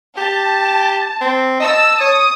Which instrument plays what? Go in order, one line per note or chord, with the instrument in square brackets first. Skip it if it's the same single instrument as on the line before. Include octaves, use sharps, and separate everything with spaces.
[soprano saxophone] G4 [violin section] A5
[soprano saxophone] C4
[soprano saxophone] D#5 [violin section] A5 E6
[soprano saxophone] C#5 [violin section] D#6